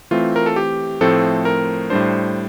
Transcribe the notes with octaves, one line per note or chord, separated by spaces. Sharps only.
E3 A3 C4 F4
A#4
A4
G4
A2 F3 A3 C4 A4
A#4
A2 G3 D4 C5